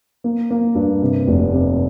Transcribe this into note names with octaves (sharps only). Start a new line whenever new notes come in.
A#3
A#3
G2
C3
F1
C3